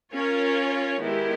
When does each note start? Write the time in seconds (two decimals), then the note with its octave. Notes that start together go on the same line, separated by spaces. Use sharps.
0.13 C#4 F4 A#4 C#5
0.99 D#3 G#3 B3 E4 G4